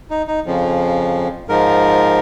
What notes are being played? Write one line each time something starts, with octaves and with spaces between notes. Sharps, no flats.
D#4
D#4
F2 C#3 F3
G#2 F3 A#4